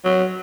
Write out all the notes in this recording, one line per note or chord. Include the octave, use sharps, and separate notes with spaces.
F#3